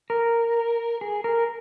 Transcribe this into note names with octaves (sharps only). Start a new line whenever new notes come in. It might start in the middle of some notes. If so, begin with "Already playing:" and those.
A#4
G#4
A#4